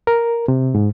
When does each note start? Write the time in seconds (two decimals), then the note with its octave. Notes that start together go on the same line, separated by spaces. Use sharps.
0.07 A#4
0.48 C3
0.75 G#2